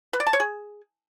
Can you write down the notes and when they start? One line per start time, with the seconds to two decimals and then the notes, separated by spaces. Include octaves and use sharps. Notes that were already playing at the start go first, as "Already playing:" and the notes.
0.13 B4
0.20 D5
0.27 A5
0.33 C#5
0.40 G#4